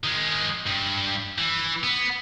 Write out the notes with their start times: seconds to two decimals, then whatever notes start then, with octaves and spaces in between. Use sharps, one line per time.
0.04 D#3 G#3
0.66 G2
1.38 E3
1.83 B3